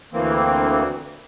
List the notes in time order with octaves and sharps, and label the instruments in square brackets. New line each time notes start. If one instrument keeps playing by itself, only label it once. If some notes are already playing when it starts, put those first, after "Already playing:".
[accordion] D2 E3 A#3 C4